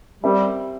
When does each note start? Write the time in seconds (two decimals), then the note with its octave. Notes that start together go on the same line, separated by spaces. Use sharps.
0.23 G3 C4 G4 A#4 E5